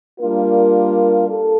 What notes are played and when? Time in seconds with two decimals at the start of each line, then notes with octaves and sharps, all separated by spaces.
0.20 G3 A#3 D4 F4 A#4
1.29 A4